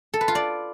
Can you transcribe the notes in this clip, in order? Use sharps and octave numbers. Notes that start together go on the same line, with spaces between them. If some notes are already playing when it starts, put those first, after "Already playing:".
A4
B4
F4
D5